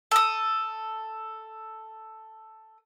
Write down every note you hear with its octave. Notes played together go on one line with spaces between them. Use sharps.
A4 D#6